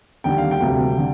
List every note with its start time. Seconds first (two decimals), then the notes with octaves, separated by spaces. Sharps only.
0.24 D#2 D3 G3 G5
0.38 F5
0.51 G5
0.60 D2 C3 G3
0.98 D3